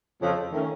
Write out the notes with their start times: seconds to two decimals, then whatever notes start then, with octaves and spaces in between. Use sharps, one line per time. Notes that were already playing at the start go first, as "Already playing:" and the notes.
0.21 F2 C#3 F3
0.51 D#3 A3 C#4